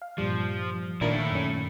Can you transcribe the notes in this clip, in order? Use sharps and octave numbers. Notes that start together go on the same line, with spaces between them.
F5
G2 A#2 F3 G3
A#2 D#3 A3 D4 E4 A#4
F#2 C#4